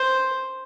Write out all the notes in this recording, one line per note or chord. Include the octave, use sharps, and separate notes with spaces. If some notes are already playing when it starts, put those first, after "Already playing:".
Already playing: C5